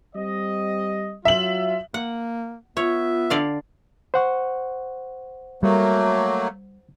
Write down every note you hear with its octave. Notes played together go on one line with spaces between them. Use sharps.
G3 C4 D#5
F#3 F4 E5 F#7
A#3 F#5
B3 F4 C#5 E5
D3 D5 F5
C5 F#5 C#6
F#3 G3 A3 A#3